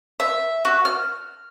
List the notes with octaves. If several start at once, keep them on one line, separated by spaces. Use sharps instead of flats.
E5
F#4
F6